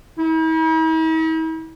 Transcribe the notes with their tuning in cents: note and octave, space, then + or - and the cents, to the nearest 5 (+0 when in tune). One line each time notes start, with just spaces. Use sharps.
E4 -45